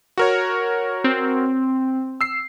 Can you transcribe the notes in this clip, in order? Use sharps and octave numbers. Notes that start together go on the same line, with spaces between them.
F#4 A#4 C#5
C4
E6 C7